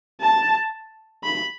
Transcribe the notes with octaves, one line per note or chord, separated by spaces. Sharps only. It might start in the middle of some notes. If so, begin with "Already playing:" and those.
A5
B5